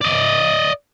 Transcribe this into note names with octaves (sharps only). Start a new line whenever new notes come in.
D5 D#5